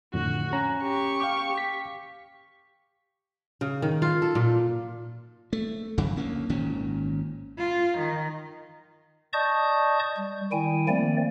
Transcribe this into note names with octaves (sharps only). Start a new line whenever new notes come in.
F2 A2 D3 F#4
C#4 G#5 A#5
G4 C#6
F5 G5 D6
B6
C#3
D#3
F4
A4
A#2
A3
G#1 F2 C#3 F#3
D2 A#3 C#4
G#1 A#2 D#3 C#4
F4
D#3
D5 D#5 A5 C#6 D#6 G6
G3
D#3 G3 E4 G5 G#5
D#3 F3 A3 A#3 C4 D5